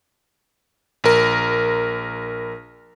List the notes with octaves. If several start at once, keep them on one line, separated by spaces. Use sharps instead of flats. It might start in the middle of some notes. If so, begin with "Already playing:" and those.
A#1 A#4